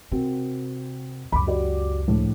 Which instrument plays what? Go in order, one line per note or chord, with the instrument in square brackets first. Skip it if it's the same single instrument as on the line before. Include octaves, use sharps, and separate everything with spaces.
[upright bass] C3 [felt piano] C4 F#4 A#4
[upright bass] C#2 F#2 [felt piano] B5 D6
[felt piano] F#4 G4 D5
A#1 A2